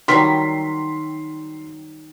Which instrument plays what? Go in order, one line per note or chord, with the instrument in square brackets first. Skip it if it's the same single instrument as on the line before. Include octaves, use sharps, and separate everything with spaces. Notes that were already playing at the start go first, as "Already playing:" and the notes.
[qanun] D#3 F#3 G3 [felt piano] C6 B6